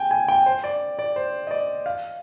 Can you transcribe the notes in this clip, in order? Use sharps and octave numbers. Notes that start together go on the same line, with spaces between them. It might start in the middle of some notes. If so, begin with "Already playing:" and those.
Already playing: G5 G#5
G#5
G5
C5
D5
D5
C5
D#5
D5
F5